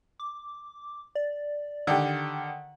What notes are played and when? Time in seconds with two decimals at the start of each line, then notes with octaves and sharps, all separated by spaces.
0.20 D6
1.15 D5
1.87 D3 D#3 G4